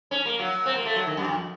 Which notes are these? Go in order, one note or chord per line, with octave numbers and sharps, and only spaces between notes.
C#4
A#3
F#3
C4
A#3
A3
F#3
D#3
F#2
F2